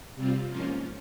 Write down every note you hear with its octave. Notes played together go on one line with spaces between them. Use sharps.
C3 G3 C4 F4
G#2 F3 A#3 C#4 F4